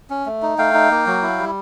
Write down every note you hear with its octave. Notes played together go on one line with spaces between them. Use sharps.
C#4
A3
D#4
A3 F5 G5
D#4
A#3
F#3
E4
G3